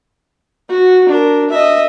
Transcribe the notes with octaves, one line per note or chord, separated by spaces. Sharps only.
F#4
D4 A#4
D#5 E5